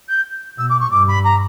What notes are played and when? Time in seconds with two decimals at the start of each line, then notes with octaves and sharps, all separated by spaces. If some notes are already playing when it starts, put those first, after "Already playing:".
0.09 G6
0.58 B2 E6
0.69 D6
0.80 C#6
0.90 G2 D6
1.08 B5
1.24 A#5